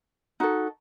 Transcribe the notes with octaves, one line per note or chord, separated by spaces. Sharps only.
D#4 F#4 A4